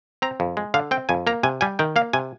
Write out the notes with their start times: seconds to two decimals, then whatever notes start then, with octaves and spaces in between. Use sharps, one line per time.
0.22 C4 A#5
0.40 F2
0.57 G#3
0.74 D3 F5
0.91 C4 G5
1.09 F2 G#5
1.27 A#3 A#5
1.43 C3 G#5
1.61 G3 G#5
1.79 D#3 G5
1.96 A#3 F5
2.13 C3 G#5